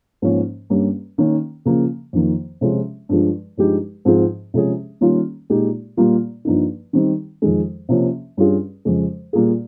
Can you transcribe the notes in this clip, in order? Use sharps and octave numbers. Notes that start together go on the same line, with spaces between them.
G#2 F3 A#3 C#4
G2 G3 A#3 C#4
D#3 A#3 C#4
C#3 F3 A#3
F2 D#3 A#3
C3 F3 G#3 C#4 F4
G2 F3 G#3
G2 F3 G#3 D#4 G4
G#2 F3 C4 F4 G#4
C3 F3 G#3 C#4 G#4
D#3 G3 A#3 C#4 F4
A#2 G#3 D#4 G4
A#2 G3 A#3 F4
G2 F3 A#3 D#4
D#3 G3 C4 D#4
F2 D#3 G#3
C3 F3 A#3 C#4
G2 G3 C#4 F4 G#4
F2 C#3 G#3
A#2 G3 A#3 F4 G#4